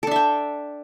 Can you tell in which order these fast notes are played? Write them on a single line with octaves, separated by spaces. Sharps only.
A4 D4 E5 G5